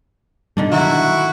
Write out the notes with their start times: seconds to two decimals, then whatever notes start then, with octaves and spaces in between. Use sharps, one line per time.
0.57 G#2 B2 D3 D#3 G3 D4
0.72 B2 D3 D#3 F#3 E4 F#4